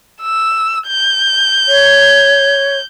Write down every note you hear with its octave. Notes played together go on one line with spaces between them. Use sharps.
E6
G6
C#5